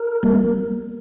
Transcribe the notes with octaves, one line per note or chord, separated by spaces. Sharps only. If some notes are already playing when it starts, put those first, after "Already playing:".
Already playing: A#4
G3 A#3